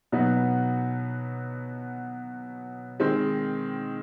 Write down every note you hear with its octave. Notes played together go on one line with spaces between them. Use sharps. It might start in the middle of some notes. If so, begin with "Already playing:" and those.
B2 F#3 B3 D#4 F#4
D#3 G#3 C4